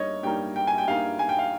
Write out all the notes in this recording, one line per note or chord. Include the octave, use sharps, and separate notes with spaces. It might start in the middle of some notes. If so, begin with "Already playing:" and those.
Already playing: G2 G3 A#3 D#4 C#5 D#5
G2 G3 A#3 D#4 G5
G5
G#5
G5
G2 G3 A#3 D#4 F5
G#5
G5
F5